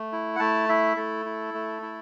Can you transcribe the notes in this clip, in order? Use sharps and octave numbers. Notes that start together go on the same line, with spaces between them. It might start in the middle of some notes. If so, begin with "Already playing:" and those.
Already playing: A3
E4
F#5
A3 A5
E4 E5
A3 A4
E4
A3
E4